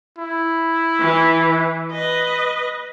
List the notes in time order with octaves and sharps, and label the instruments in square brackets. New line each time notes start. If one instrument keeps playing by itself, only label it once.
[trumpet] E4
[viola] E3
B4 D#5